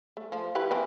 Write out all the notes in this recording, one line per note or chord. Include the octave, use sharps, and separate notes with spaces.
A3
F3
E4 G4 B4
E3 C4